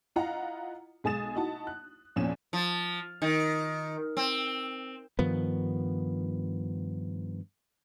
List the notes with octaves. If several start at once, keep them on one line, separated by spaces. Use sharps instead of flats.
E4 F4 D#5 F5 F#5 A#5
B1 G#3 G#5 D#6 A6 E7
D#4 E4 F#4 A5
F#6
E2 A#2 F3 C#4 E7
F3
D#3
C4
G2 D#3 F3 B3